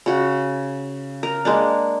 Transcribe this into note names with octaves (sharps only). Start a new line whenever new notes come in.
C#3 F#4
A#4
G#3 A#3 D4